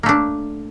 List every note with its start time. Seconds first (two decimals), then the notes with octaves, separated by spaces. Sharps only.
0.03 A#3
0.06 A3
0.09 D4